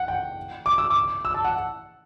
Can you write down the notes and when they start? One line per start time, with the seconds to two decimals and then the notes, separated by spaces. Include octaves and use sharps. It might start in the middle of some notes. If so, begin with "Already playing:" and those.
Already playing: F#5
0.08 G5
0.66 D6
0.78 E6
0.90 D6
1.25 E6
1.34 A5
1.45 F#5